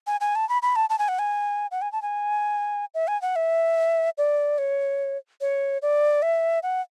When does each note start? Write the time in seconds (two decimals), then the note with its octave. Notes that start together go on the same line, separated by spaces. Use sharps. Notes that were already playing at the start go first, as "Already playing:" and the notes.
0.07 G#5
0.21 G#5
0.35 A5
0.49 B5
0.62 B5
0.76 A5
0.90 A5
0.99 G#5
1.08 F#5
1.19 G#5
1.71 F#5
1.82 G#5
1.92 A5
2.02 G#5
2.94 E5
3.08 G#5
3.22 F#5
3.36 E5
4.18 D5
4.58 C#5
5.41 C#5
5.82 D5
6.22 E5
6.63 F#5